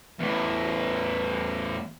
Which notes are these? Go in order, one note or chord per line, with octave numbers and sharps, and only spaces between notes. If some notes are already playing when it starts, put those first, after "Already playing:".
E2 A2